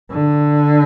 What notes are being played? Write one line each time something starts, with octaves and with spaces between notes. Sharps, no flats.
D3